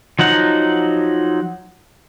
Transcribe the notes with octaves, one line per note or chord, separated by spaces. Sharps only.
F3 F#3 D#4 F#5